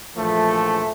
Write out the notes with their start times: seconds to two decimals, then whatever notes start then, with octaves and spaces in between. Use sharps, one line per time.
0.16 A#1 E3 F3 A3